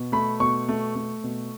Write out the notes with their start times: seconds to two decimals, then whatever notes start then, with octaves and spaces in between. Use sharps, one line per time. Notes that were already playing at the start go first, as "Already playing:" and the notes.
Already playing: B2
0.12 A3 B5
0.40 B2 C#6
0.68 A3
0.95 A3
1.23 B2